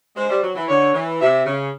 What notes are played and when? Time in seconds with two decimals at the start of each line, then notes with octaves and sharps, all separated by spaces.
0.16 G#3 C5
0.30 G3
0.42 F#3
0.56 E3
0.68 D3 C#5
0.94 E3
1.21 C3 E5
1.46 C#3